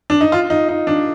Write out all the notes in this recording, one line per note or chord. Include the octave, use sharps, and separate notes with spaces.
D4
D#4
F4
D#4
D#4
D4